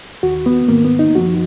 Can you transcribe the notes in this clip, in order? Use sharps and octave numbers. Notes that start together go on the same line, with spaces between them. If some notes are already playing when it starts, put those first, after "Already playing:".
D#2 D#3 F#4
B3
G#2 D#3 A#3
B3
D#4
F#2 F3 F#4